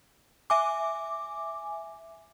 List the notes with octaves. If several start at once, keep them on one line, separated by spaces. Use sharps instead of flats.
E5 G#5 D6